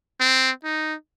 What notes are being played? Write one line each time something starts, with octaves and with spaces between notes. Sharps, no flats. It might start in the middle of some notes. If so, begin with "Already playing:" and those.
C4
D#4